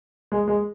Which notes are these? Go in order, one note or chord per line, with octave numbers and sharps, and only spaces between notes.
G#3
G#3